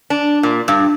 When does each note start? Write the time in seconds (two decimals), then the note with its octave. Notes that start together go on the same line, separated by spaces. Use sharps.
0.10 D4
0.43 A#2
0.68 G2